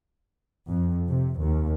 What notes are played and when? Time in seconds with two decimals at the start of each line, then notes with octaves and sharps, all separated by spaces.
0.70 F2
1.08 C3
1.42 D#2